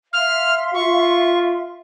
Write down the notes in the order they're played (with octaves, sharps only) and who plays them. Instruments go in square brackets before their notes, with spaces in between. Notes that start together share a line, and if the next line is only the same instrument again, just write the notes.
[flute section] E5 F5 C6 [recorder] F6
[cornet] F4 [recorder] C#6